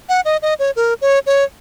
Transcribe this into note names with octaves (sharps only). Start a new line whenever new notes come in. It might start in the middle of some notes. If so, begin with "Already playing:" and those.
F#5
D#5
D#5
C#5
A#4
C#5
C#5